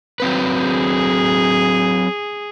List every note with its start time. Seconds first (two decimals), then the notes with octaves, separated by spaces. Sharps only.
0.20 F#3 C4 B4
0.61 G#4